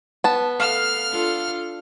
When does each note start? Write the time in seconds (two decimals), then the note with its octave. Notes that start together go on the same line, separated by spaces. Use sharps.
0.24 B3 A5
0.60 A4 F5 F6
1.11 D4 F4 A4